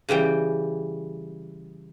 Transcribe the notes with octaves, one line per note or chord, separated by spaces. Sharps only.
C#3 E3 G3 G5